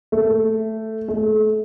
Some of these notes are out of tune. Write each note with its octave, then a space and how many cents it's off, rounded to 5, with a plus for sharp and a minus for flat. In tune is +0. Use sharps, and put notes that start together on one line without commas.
A3 +5
A3 -35